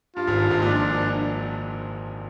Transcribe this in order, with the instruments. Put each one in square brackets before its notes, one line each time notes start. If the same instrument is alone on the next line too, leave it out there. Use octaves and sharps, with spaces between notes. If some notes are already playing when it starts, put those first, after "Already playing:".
[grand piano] G2 [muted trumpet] F4
[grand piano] G#1 G#2
G2
G#1 G#2
[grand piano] A#1 A#2 [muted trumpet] D4